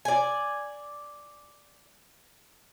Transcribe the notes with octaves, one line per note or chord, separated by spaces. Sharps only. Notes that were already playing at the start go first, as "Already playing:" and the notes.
D5 G#5